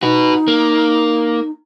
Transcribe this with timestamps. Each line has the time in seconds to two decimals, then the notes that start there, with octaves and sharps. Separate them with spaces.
0.03 D#4 F#4 B4
0.48 A#3